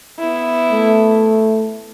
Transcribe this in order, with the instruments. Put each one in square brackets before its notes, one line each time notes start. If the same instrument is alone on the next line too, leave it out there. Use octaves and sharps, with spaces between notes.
[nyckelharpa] B3 E4
[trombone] A3